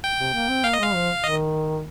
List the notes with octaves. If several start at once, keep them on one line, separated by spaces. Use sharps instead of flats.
G5
C3
A#3
C4
A#3 F5
D#5
G#3 F5
F3
D#3 D#5